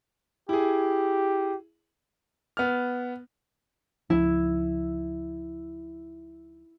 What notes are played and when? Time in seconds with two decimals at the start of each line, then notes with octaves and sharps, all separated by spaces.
0.49 E4 G4 G#4
2.57 B3 F6
4.10 C#2 F3 E4